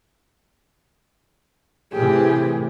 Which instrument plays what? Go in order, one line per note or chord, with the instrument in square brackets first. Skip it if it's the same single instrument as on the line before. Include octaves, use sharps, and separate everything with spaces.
[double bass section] A2 C3 E3 [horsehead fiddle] G4 G#4